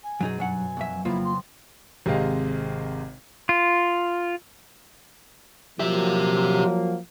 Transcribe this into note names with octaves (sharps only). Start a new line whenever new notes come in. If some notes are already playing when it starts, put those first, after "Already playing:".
G#5
F#2 B2 F#3 D#4 G#4
G2 F#3 F#5 G#5
B1 F2 F#3 A#3 E5
F2 C#3 A#3 B3 E4 F4
C6
G#1 C3 G#3 G4 D#5 F5
F4
F3 F#3 A#3 G4 E5